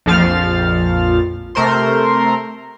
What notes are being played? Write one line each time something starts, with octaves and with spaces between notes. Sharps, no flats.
A#1 F2 F3 F5 F6 A6
C3 A3 A#4 C5 C6